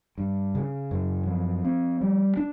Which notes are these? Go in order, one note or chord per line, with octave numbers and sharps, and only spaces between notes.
G2
C#3
F#2
F3
C4
G3
D4